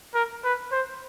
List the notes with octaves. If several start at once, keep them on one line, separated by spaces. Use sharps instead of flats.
A#4
B4
C5